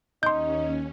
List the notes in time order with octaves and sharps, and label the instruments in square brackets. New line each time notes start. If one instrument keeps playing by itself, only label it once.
[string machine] D#2 C#4 [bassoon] D#4 [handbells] C6 G6